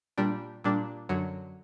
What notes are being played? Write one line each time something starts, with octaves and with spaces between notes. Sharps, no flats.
A#2 G3 D4
A#2 G3 D4
F#2 D3 F#3